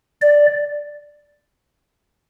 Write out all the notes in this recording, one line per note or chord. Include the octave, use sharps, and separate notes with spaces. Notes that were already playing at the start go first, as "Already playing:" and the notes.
D5